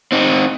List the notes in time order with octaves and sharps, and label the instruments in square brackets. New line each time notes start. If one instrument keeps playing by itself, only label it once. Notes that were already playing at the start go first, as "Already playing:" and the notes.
[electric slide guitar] C4 D#4